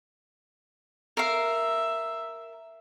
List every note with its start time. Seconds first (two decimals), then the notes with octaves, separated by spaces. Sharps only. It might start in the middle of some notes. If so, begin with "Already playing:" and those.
1.17 A#4 E5 F5